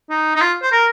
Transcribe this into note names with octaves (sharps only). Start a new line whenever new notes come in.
D#4
D#4
F4
C5
A#4